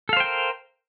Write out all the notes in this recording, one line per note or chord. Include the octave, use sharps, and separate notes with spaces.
A4 A#4 C5 F5 G5